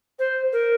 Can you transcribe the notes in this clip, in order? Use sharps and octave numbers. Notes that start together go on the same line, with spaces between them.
C5
A#4